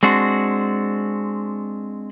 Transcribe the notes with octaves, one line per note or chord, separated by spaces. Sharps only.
G#3 C4 D4 F#4